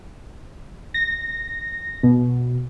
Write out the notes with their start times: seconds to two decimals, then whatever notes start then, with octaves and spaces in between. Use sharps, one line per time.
0.94 A#6
2.03 B2